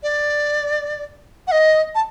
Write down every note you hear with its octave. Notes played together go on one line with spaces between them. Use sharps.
D5
F#5
D#5
A5